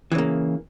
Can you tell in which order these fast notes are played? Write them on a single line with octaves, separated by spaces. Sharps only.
E3 C#3 A#3